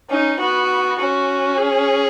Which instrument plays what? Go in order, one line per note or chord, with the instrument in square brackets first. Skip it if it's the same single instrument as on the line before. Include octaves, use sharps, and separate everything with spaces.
[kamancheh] C#4 [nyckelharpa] D#4
[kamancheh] B3 [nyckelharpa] F#4
[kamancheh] C#4 [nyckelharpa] F#4
[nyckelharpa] G#4